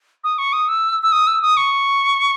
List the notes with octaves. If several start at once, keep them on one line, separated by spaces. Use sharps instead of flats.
D#6
C#6
D#6
E6
E6
D#6
E6
D#6
C#6